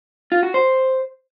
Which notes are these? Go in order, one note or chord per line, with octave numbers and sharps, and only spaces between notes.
F4
F#4
C5